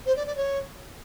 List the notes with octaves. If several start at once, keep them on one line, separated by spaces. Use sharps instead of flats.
C5
D5
D5
C#5